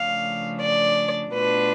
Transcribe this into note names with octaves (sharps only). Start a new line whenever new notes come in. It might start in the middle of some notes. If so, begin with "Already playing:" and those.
Already playing: C#3 F3 A3 D4 F5
D5
B2 A3 D4 F4 B4